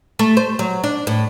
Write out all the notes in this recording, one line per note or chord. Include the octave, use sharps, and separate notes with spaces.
A3
C5
F#3
D4
A2